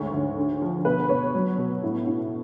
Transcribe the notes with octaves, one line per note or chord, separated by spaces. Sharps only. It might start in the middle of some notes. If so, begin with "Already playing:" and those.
Already playing: D2 G#2 C#5
D2
D3
F3
B2 B4
B2 C#5
F#3
B2
A2
A2